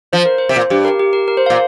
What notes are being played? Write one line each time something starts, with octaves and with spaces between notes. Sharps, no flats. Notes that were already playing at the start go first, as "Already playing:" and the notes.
F3 C5
A#4
C5
C3
A#2
G2 G4
A#4
G4
A#4
A#4
C5
A#2 F5